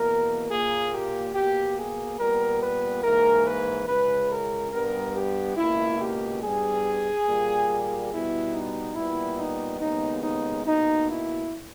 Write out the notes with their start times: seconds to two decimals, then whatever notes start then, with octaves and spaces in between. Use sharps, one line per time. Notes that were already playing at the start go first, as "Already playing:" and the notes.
Already playing: E2 B2 A#3 A#4
0.50 A#2 A#3 G#4
0.93 G4
1.34 B2 A#3 G4
1.77 G#4
2.19 A#2 G3 B3 A#4
2.61 B4
3.03 G#2 E3 A#3 A#4
3.46 B4
3.88 C#2 C#3 G#3 B4
4.31 A#4
4.73 G2 G3 B3 A#4
5.15 G4
5.57 C#2 B2 A#3 E4
6.00 G4
6.42 G2 G3 B3 G#4
7.27 A#2 G3 A#3
8.12 B2 G3 B3 E4
8.54 D#4
8.96 A#2 G3 B3 E4
9.39 D#4
9.80 D#2 C#3 G#3 B3 D#4
10.22 D#4
10.65 B2 A#3 D#4
11.08 E4